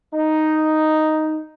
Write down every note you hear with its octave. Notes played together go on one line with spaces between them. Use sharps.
D#4